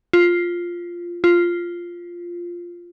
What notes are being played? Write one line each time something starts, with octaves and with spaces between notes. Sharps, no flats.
F4
F4